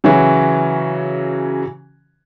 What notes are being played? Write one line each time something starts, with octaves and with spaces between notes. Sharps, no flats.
C#3 E3 F#3 F#4